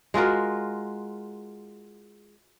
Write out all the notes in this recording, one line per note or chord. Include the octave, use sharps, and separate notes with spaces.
G#3 F4 F#4 A#4